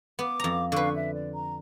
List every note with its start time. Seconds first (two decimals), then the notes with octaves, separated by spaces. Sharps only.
0.19 B3 D6
0.40 F2 A#5
0.72 D3 D4 B4 F5 C#6
0.95 E5
1.14 D5
1.33 A#5